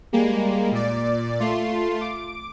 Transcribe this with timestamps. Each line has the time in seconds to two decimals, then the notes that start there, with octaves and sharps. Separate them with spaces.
0.13 G3 G#3 A#3
0.71 A#2 D5
1.40 A3 F4 C6
2.01 D6